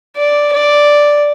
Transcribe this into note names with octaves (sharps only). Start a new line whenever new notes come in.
D5
D5